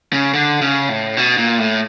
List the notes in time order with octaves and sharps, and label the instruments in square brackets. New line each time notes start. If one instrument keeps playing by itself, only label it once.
[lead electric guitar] C#3
D3
C#3
A2
B2
A#2
A2